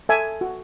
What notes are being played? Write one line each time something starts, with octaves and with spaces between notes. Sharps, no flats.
A4 E5 G#5
F#4